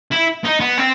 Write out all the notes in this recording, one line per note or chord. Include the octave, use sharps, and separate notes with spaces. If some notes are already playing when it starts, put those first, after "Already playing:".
E4
D#4
B3
C4